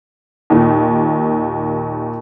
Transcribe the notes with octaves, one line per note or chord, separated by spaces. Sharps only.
D#2 A#2